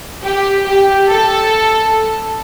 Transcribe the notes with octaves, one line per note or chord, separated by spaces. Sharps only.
G4
G4
A4